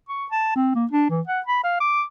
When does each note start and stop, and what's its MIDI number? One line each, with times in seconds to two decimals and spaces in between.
0.09 0.26 85
0.31 0.52 81
0.55 0.73 60
0.75 0.86 58
0.91 1.06 62
1.09 1.21 52
1.27 1.40 78
1.46 1.62 83
1.64 1.79 77
1.80 2.03 86